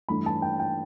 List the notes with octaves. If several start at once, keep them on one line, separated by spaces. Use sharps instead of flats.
G2 E3 A3 D4 B5
A5
G5
G5